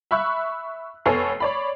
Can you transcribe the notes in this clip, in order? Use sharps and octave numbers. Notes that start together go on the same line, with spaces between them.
E5 B5 C#6 E6 F#6
F1 B3 A4 C#5 G#5 C7
C#5 D5 B5